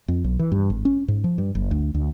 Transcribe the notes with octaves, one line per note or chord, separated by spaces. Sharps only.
F2
B1
E3
G2
G#1
C#4
G#2
F3
G2
F#1
D2
D2